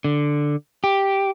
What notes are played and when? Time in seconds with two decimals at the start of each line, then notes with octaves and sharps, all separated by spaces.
0.04 D3
0.84 G4